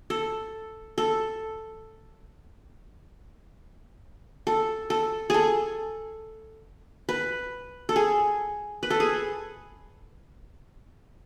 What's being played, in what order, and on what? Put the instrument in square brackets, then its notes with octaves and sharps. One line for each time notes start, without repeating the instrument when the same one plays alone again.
[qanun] A4
A4
A4
A4
G#4 A4
B4
A4
G#4
B4
A4
G#4